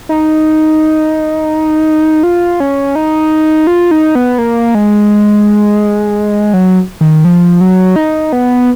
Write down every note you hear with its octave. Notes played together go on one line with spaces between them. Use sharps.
D#4
F4
C#4
D#4
F4
D#4
B3
A#3
G#3
F#3
D#3
F3
F#3
D#4
B3